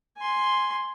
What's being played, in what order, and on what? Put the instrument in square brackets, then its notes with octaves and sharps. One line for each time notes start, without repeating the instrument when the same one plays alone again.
[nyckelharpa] G#5 C6